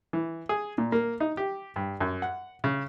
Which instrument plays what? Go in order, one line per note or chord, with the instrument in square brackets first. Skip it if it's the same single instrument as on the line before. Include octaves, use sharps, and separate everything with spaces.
[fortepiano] E3
G#4
A#2
A#3
D#4
G4
G2
F#2
F#5
C#3